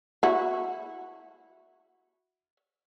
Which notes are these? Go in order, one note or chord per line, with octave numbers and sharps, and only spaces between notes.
E4 F#4